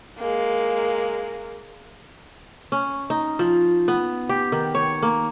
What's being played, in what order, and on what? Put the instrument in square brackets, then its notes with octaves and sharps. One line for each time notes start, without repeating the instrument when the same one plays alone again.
[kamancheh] G#3 A#3
[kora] C#4
D#4
F3
B3
G4
D#3
C#5
A#3